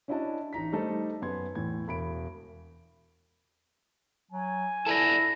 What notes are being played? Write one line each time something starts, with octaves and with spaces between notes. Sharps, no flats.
C#4 D4 E4 F#4 D#5 A5
A1 D#4 A#5 B6
G3 A3 D#4 A4 C5 D#5
F#2 B3 C6 G#6
E2 A2 G#6
E1 B5 D7
F#3 G#5
E4 A4 B4 D5 A5 A#6